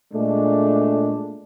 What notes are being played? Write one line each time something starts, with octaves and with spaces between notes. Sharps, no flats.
A#2 G#3 A3 D4